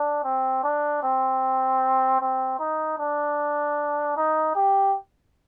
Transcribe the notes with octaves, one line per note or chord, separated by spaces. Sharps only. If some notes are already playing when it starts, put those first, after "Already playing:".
Already playing: D4
C4
D4
C4
C4
D#4
D4
D#4
G4